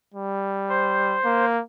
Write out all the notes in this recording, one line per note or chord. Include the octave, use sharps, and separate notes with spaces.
G3
C5
A#3